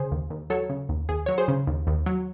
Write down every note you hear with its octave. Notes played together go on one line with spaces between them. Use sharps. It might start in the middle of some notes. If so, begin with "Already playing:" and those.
Already playing: C#3 G#4 C5
D#2
D#2
F#3 A4 C#5
C#3
D#2
D#2 G#4
F#3 C#5
G#4 C5
C#3
D#2
D#2
F#3